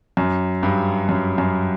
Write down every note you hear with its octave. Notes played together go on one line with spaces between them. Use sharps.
F#2
G2
F#2
F#2